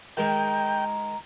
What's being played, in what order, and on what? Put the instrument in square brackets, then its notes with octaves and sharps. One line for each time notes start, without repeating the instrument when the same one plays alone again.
[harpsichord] D#3 G#3 [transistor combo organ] G5 [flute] A#5